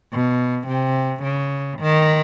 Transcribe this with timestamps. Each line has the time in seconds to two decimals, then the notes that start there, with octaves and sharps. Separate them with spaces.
0.13 B2
0.68 C3
1.23 C#3
1.80 D#3